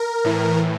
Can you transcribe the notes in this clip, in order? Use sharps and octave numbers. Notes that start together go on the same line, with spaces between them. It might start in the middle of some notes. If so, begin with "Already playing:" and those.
Already playing: A#4
A2 E3